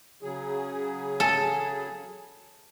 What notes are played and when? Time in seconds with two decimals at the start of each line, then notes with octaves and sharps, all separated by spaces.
0.22 C#3 F#3 G#4
1.20 A4 G#5